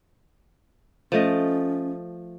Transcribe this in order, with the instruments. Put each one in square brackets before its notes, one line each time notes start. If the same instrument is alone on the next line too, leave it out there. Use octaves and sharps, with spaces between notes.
[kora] F3 A3 D#5 [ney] C#4